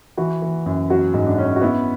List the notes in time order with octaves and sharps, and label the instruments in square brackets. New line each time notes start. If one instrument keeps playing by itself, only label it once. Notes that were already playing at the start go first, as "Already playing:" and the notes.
[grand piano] E3 [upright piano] F#4
[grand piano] E3
F#2
[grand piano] F#3 [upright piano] F#4
[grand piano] G#2
[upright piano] D4
[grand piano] C#4
[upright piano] F#4
[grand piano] B3 [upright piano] E4